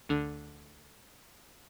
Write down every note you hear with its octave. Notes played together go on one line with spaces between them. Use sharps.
D2 D3